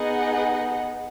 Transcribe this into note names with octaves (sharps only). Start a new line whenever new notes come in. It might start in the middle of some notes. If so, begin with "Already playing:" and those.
Already playing: B3 D#4 G#4 D#5 F#5